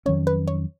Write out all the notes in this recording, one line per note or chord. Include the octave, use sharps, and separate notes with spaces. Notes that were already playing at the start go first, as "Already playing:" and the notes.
F2 D#3 F#3 C#4 C#5
B4
C#5